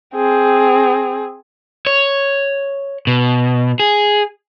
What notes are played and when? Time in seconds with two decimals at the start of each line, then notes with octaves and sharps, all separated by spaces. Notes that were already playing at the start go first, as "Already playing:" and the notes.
0.14 C4 G#4
1.87 C#5
3.07 B2
3.80 G#4